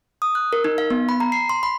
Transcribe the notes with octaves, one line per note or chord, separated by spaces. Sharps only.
D#6
F#6
A#4
D#4
F5
B3
B5
A#5
C7
C6
B5